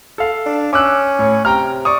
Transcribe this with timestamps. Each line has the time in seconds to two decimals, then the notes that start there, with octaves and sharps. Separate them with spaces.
0.18 A4 F5
0.46 D4
0.73 C#4 D6 E6 F#6
1.19 A2 C#5
1.45 C3 G5 A#5 F6
1.85 D5 C#6 D#6